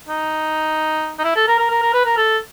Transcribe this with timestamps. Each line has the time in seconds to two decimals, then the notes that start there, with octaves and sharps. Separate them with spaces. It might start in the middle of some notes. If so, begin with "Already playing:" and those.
0.09 D#4
1.19 D#4
1.24 E4
1.36 A4
1.48 A#4
1.59 A#4
1.71 A#4
1.82 A#4
1.94 B4
2.05 A#4
2.17 A4